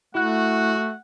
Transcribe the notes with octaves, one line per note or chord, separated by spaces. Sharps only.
A3 E4 F#4 F#5 F#6